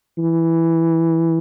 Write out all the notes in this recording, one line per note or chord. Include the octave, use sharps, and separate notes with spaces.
E3